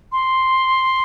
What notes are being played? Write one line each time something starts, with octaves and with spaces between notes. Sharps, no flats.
C6